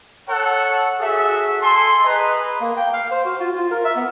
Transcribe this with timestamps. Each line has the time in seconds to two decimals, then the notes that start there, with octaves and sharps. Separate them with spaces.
0.28 A4 C#5 F#5
0.99 F#4 G#4 A4 E5
1.60 A4 G#5 C6
2.03 G#4 B4 D#5 A#5
2.61 A#3
2.77 G5
2.93 F5
3.11 C5
3.25 F#4
3.40 F4
3.55 F4
3.71 A#4
3.84 E5
3.96 B3